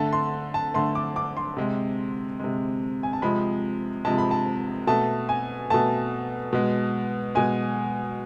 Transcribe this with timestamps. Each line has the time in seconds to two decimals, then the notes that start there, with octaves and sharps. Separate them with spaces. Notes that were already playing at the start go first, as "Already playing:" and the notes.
Already playing: D3 A3 A5
0.13 C6
0.54 A5
0.74 D3 A3 C6
0.95 D6
1.16 D6
1.37 C6
1.57 C3 G#3
2.40 C3 G#3
3.03 G#5
3.13 A5
3.22 C3 F3 G#3 B5
4.05 C3 F3 G#3 A5
4.18 B5
4.31 A5
4.87 B2 A3 A5
5.29 G#5
5.70 B2 A3 A5
6.53 B2 G#3
7.35 B2 G#3 G#5